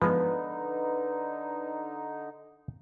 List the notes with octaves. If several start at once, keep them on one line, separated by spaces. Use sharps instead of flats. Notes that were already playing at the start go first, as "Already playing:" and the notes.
D3 F3 G#3 B3 D#4 B4